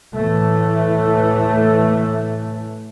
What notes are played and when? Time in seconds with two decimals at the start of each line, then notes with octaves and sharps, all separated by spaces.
0.14 A2 E3 A3